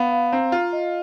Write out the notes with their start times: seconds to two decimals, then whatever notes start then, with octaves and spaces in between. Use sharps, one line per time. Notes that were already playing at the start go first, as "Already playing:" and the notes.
Already playing: B3 F5
0.12 F5
0.32 C4 A#5
0.52 F4 F5
0.73 D#5